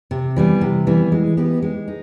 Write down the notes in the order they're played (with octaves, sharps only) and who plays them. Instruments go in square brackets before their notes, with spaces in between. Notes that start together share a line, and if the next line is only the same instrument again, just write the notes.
[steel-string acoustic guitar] C3
E3 G3 B3
C3
E3 G3 B3
G#3
B3 D#4 G4
G#3
D#4